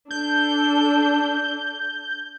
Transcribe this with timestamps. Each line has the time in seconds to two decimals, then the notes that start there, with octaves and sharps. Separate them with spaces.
0.11 D4 A4 G6